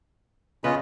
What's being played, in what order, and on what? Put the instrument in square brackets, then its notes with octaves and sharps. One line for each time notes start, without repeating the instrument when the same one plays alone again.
[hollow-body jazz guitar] C#3 B3 B4 [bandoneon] C#4 F4 D#5